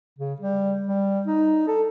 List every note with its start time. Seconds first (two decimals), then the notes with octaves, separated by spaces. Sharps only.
0.19 C#3
0.40 G3
0.87 G3
1.27 D#4
1.68 A4